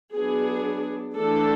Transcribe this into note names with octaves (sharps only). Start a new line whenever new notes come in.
F#3 B3 D4 G#4
E3 A3 D4 A4